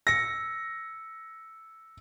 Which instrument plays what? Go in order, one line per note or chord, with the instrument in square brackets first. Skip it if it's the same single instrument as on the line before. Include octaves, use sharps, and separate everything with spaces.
[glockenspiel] E6 C#7 [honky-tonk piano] A#6